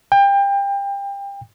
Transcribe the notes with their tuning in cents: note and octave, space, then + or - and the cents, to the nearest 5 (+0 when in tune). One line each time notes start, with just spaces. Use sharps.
G5 +30